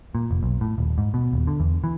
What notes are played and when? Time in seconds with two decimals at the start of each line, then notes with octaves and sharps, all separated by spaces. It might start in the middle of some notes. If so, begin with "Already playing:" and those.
0.15 A#2
0.31 F1
0.43 B1
0.61 A2
0.78 D#1
0.98 G#2
1.14 B2
1.33 D#1
1.47 D3
1.60 E2
1.84 E3